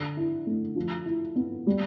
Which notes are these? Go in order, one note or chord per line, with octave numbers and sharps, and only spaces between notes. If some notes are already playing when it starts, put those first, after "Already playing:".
Already playing: D3
E4
A3
F3
E4
B3
G3